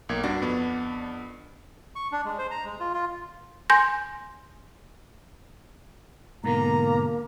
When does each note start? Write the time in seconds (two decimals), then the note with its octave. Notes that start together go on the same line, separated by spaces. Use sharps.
0.09 B1 A#3 G#6
0.23 G2 D4 F#4
0.42 F2 B3
1.96 C#6
2.12 D4
2.25 G#3
2.38 C5
2.51 A#5
2.65 G#3
2.80 F4
2.94 F4
3.70 G#5 C6 G6 A#6
6.44 G#2 B2 D3 A#3 A#5